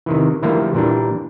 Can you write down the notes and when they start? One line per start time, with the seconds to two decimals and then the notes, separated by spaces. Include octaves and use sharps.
0.06 C3 D#3 E3
0.42 D3 E3 F3 G3 A3 A#3
0.74 A#2 E3 G3 D4